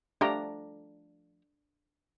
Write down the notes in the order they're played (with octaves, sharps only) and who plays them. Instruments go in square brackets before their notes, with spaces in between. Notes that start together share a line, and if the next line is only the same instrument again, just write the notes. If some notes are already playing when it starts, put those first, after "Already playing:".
[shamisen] F3 A3 G4 [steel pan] D4 A#5 D6